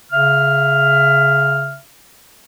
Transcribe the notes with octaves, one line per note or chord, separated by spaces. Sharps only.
C#3 E5 F6